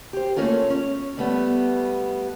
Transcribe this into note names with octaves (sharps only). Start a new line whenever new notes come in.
G4 C5
A3 A#3 C#4 F4 A4
C#4
G3 A3 B3